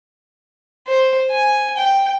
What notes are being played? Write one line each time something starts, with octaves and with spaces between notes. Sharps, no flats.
C5
G#5
G5